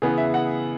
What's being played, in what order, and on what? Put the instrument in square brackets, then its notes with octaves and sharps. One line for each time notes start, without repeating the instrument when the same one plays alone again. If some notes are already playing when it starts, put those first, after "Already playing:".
[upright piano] C#3 E3 B3 G#4
E5
F#5